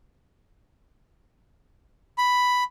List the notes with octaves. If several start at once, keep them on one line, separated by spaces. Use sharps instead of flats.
B5